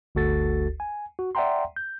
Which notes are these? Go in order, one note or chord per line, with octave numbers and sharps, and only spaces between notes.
G1 D2 F#4 A4 A6
G#5
F#4
D5 E5 F#5 G5 A#5 C6
G6